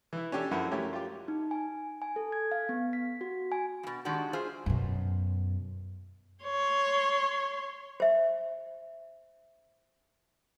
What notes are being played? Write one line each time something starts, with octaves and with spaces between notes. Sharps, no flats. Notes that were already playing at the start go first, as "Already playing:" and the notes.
E3 E4
C#4 D4 G4 A4 C#5
F#2 F3 E4 B4 F#5
A3 C#4 E4 G4 A#4
F4 G4
D#4
G#5
G#5
A4
G#6
F5
B3
B6
F#4
G#5
G2 B2
D#3 G#3 D4 F#4 G4
F4 G#4 C5 E5
F#2 B2
C#5 C6
C5 E5